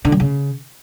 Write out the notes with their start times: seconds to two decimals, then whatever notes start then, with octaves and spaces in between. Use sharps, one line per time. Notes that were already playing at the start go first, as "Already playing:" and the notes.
0.05 D3
0.12 F#3
0.20 C#3